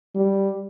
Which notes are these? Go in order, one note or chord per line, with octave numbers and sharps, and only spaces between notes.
G3